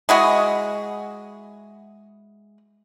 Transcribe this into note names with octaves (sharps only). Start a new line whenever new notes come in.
G#3 E4 F#4 G#4